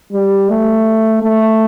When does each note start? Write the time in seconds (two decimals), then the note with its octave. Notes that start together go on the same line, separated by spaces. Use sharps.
0.12 G3
0.49 A3
1.22 A3